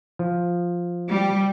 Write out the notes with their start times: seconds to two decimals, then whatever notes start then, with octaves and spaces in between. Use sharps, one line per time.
0.19 F3
1.09 G3